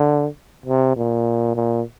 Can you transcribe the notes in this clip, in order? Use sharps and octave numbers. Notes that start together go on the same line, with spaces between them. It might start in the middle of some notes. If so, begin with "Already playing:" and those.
Already playing: D3
C3
A#2
A#2